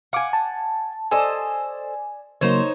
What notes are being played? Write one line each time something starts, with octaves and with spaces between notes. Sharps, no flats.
F5 F#5 G#5 D6
A5
A4 C5 D5 D#5 G#5
C#3 F#3 A#3 D#4 C5 C#5